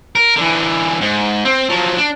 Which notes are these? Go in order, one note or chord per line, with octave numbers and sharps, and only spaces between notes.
A#4
D3 E3
G#2
C4
F3 F#3
D4